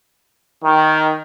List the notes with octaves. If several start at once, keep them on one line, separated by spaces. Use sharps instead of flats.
D#3